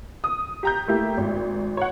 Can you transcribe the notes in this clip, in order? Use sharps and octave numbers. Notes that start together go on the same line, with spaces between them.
D#6
G4 A#5 G6
A3 A#3 E4 G4
G#1
C#5 F#5